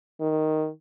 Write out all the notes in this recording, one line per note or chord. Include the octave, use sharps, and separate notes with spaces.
D#3